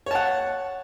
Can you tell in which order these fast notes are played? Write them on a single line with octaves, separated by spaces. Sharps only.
C#5 A5 F#5